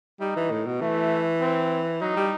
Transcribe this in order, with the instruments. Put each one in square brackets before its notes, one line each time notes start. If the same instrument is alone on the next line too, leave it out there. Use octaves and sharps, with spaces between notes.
[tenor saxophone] G3 [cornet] D#4
[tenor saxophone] E3
A2
B2
[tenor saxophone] E3 [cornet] A3
[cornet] C4
[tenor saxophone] F#3 [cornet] D#4
[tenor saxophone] G3